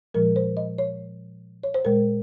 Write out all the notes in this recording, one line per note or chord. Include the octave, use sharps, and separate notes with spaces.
A#2 F3 G#3 A#4
C5
D#5
C#5
C#5
C5
A#2 G#3 A#4